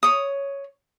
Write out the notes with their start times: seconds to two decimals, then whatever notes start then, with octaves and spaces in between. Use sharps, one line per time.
0.03 C#5 D#6